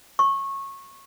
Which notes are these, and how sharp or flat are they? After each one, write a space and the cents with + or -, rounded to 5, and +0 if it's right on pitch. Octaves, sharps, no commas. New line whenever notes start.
C#6 -20